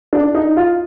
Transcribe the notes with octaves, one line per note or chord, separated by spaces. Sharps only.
D4
D#4
F4